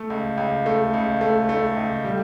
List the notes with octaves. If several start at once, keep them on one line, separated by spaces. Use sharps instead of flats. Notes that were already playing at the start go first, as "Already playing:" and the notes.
Already playing: A3
C#2
C#2
A3
C#2
A3
A3
C#2
G3